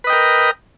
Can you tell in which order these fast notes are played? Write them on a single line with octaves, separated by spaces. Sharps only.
B4 D#5 G5 A#4